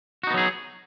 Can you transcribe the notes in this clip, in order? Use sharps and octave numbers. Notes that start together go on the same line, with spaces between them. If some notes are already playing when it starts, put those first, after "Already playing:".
F#3 B3 D#4 F#4 G#4